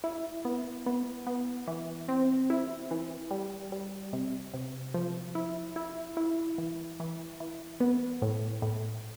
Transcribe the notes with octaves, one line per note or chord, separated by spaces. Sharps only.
E4
B3
B3
B3
E3
C4
E4
E3
G3
G3
C3
C3
F3
E4
E4
E4
E3
E3
E3
B3
A2
A2